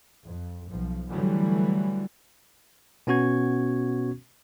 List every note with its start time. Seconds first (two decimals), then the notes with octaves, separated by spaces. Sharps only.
0.23 F2
0.68 B1 F3
1.09 D3 E3 F#3 G3 A3
3.07 B2 B3 C#4 F#4 C#6 G#6